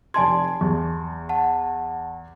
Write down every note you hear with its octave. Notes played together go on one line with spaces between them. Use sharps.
F1 D5 G#5 A5 C6 G#6
E2
F#5 A5